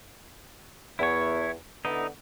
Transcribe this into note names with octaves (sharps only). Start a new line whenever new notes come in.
E2 E4 C#5
D3 B3 D#4 E4